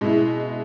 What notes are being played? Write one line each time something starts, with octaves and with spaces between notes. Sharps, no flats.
B2 G#3 E4